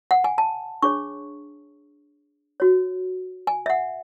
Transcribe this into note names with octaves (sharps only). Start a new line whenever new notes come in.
F#5
G#5
A5
D4 G#4 C#5 C#6
F#4 C#5
G#5
E5
F#5